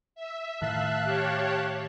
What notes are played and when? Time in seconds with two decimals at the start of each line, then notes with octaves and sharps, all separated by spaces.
0.15 E5
0.62 A2 D#3 F5 A5 F#6
1.04 G4 C#5